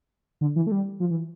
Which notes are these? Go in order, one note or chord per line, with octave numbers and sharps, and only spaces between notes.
D3
E3
A3
G3
F3
E3